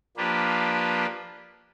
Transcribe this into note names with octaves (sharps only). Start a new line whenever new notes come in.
F3 A#3 D4 G4 B4